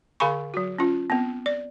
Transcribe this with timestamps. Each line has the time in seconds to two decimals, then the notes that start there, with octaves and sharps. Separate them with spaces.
0.20 D3 G#4 F5 G#5 B5 C#6
0.54 F#3 F#4
0.78 C#4 F4
1.10 B3 C4
1.46 D5